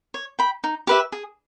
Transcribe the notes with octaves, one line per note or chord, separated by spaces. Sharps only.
C#5
G5 B5
D#4
G4 B4 E5
G#4